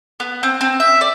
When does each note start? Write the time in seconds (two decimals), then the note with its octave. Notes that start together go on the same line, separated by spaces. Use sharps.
0.20 B3
0.43 C4
0.61 C4
0.80 E5
1.01 D5